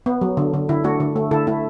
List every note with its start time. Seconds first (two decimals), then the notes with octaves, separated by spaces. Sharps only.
0.06 B3
0.21 F#3
0.37 D3
0.54 D3
0.69 D3 E4
0.84 A3 D4 F#4
1.00 D3
1.16 A3
1.31 D3 E4 A4
1.47 A3 E4